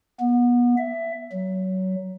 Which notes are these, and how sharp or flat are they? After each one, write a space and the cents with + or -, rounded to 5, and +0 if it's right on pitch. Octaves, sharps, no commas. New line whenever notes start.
B3 -30
E5 +15
F#3 +20